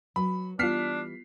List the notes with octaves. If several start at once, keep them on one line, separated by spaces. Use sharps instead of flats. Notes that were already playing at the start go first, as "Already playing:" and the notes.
F#3 B4 B5
E3 G3 B3 D4 F4 F6 B6 C7